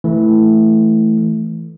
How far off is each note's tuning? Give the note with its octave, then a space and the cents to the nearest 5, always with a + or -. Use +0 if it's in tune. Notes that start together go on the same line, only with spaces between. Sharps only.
E3 +0 A3 +0